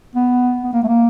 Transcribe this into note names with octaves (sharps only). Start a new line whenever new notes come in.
B3
B3
A#3
A3
A#3